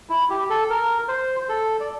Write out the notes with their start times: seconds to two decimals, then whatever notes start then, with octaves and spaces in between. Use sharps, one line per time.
0.09 E4
0.30 G4
0.50 A4
0.70 A#4
1.08 C5
1.49 A4
1.80 D5